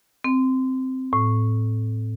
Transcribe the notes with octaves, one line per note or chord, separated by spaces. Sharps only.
C4
A2